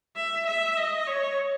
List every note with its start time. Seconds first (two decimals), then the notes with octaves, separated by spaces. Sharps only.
0.16 E5
0.47 E5
0.77 D#5
1.07 C#5